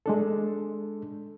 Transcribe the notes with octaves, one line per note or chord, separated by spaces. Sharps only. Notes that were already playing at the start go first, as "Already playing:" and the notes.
G#3 D4 A4